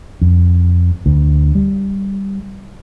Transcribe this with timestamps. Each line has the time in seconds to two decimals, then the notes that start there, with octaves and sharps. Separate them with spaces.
0.21 F2
1.06 D2
1.55 G3